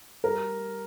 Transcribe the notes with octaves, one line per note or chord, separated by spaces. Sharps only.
G3 A#4